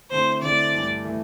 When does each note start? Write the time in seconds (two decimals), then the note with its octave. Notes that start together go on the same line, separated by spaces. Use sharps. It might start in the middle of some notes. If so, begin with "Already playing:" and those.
0.10 D3 A3 C4 E4 C5
0.42 D3 A3 C4 E4 D5
0.73 G2 E3 A3
1.04 E3 A3